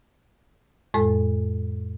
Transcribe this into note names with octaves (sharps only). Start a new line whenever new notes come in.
F2 A2 G#3 A4